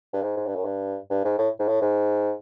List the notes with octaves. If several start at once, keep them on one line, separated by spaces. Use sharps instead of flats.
G2
G#2
G#2
G2
F#2
G2
G2
G#2
A2
G#2
A2
G#2